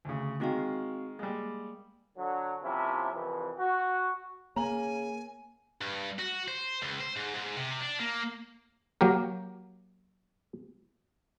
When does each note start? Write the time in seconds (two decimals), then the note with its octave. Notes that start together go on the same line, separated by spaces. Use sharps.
0.05 D2 C#3
0.40 D#3 G#3 C4 F#4 F5
1.19 G3 G#3 A#3
2.17 D3 F#3
2.63 C3 F3 A#3 C#4 E4
3.13 C2 F2 E3
3.59 F#4
4.56 C#3 A#3 G#5 A#5 F#7
5.81 G2
6.18 F#4
6.48 C5
6.82 C#2
7.01 C5
7.16 G#2
7.34 G#2
7.57 C3
7.80 D4
8.00 A#3
9.01 F#3 A#3 G4 A#4